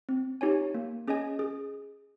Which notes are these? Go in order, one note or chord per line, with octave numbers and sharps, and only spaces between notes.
C4
D#4 G4 C#5 G#5
A#3
C#4 G#4 D#5 G#5
G#4